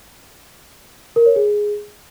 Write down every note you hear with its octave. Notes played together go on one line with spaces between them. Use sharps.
A#4
C#5
G#4